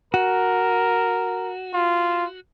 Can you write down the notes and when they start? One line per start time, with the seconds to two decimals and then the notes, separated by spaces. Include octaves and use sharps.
0.14 F#4 A#4
1.74 F4